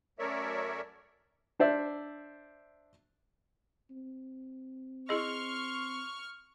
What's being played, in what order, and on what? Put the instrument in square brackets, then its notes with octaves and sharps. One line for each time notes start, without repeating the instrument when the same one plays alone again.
[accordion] F#2 A3 A#4 C#5 D5 E5
[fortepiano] D4 C5 D5 E5
[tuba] C4
[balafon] E4 G#4 D#5 [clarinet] C6 [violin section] C#6 F6